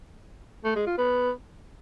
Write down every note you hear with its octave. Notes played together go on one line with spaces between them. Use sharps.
A3
G#3
F4
B3